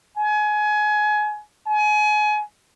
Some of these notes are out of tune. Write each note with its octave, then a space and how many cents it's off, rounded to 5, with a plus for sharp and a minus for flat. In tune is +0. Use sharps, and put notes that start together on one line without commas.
G#5 +25
G#5 +30